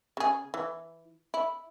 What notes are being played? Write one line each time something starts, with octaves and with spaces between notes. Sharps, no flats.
C#3 G#4
E3
E4